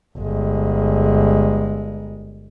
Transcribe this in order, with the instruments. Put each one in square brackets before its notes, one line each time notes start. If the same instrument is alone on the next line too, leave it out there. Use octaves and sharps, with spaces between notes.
[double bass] G1 G#3